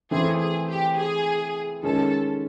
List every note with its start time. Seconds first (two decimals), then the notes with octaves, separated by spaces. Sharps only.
0.11 E3 A3 C4 E4 G#4
0.40 G#4
0.69 G4
0.98 G#4
1.83 D#3 G#3 C#4 A4